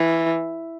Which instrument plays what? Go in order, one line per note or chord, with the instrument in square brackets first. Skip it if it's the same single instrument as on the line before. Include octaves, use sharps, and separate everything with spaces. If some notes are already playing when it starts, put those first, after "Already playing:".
Already playing: [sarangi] E3